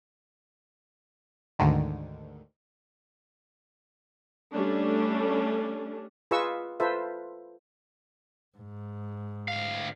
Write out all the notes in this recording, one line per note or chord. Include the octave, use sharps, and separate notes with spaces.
D2 G#2 D3 D#3
G3 A3 C#4 D4
F4 G#4 B4 D#5 C#6 E6
F4 A4 B4 C5 E5
G#2
D2 F5